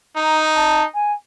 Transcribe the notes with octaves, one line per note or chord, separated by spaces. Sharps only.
D#4 A#5
A5
G#5